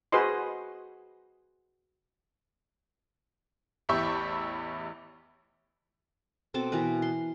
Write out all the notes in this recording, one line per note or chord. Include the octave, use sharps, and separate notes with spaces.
F#4 G#4 B4 C5 D#5 C6
A1 E2 G4 E5 B5 C#6
B2 C4 A4 D6
B2 E3 A#4 B4
C6